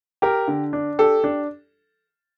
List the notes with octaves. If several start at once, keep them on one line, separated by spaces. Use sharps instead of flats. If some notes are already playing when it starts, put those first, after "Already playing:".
G4 A#4
D3
D4
G4 A4
D4